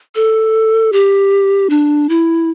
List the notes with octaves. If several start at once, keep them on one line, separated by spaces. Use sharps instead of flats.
A4
G4
D4
E4